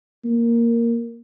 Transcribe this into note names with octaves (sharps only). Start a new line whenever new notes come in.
A#3